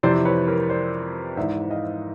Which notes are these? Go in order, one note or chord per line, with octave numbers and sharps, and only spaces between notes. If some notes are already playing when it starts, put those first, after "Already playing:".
F2 C3 E3 C5 D5
B4 C#5
A#4 C5
C5 D5
G#2 E3 D5 E5
D#5 F5